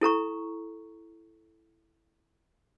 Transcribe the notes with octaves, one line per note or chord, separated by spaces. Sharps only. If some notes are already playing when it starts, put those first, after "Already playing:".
E4 A4 A#5 C#6